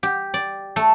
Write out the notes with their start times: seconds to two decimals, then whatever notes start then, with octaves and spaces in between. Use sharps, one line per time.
0.03 G4
0.34 D5
0.76 A3